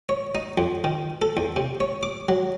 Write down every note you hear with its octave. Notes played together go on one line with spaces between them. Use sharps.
C#5
D#4
F2
D#3
A4
E2
C3
C#5
D6
F#3